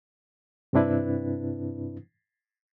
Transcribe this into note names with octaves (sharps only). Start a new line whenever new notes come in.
G2 C3 C4 D4 E4 B4